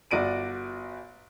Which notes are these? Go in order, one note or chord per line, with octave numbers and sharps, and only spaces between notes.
G1 F#4 D5 D7 D#7